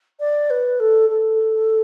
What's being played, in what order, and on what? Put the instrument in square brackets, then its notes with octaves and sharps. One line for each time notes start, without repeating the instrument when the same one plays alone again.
[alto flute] D5
B4
A4
A4